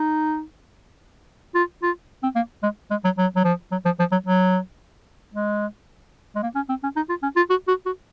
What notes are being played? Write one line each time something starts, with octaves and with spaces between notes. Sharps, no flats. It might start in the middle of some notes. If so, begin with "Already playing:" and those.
Already playing: D#4
F4
F4
C4
A#3
G#3
G#3
F#3
F#3
F#3
F3
F#3
F3
F3
F#3
F#3
G#3
G#3
A#3
C#4
C4
C#4
D#4
F4
C#4
F4
F#4
F#4
F#4